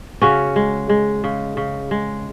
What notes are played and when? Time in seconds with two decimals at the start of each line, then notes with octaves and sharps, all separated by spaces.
0.22 C#3 C#4 F#4
0.56 G#3
0.89 G#3
1.24 C#3
1.57 C#3
1.91 G#3